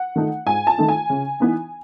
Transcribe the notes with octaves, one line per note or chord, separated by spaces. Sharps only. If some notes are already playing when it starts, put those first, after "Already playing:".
Already playing: F#5
D#3 A3 D#4
G#2 G#5
A5
D#3 A3 D#4
G#5
C#3
E3 B3 D#4